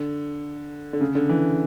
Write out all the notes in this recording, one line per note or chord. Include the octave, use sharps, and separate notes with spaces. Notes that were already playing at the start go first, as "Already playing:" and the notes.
Already playing: D3
D3
C#3
D3
E3